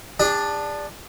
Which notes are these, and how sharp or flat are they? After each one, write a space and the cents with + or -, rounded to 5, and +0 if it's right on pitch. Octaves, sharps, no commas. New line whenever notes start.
D4 +0 G#4 -45